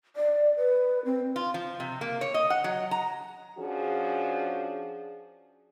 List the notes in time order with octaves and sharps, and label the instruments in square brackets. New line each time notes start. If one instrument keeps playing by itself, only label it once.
[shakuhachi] D5
B4
C4
[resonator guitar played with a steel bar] F4
F3
C3
A#3
C#5
D#5
F#5
F#3
A#5
[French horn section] F3 C#4 D4 F#4 G#4